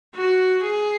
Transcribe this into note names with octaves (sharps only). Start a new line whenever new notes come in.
F#4
G#4